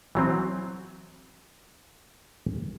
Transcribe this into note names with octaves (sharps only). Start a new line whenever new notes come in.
E3 F#3 C4